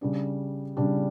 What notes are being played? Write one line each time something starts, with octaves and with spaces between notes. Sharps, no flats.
C#3 G3 D4
C#3 G3 D4